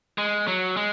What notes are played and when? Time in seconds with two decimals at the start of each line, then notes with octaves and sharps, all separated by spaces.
0.18 G#3
0.47 F#3
0.77 G#3